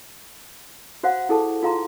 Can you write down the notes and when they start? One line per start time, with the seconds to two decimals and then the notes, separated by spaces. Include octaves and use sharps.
1.03 F#4 C5 F5 F#5
1.29 E4 G#4 A4 A5
1.63 F4 G#4 F5 A#5 C6